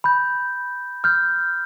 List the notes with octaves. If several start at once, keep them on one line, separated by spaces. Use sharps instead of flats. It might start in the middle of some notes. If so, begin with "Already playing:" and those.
B5 G6
F6 G6